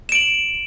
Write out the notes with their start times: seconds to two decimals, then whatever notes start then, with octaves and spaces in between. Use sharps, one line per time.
0.09 E7
0.12 D7
0.15 F#7